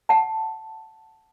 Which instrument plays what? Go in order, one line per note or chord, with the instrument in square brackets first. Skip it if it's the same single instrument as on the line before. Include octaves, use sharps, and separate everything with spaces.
[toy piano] F#5 A5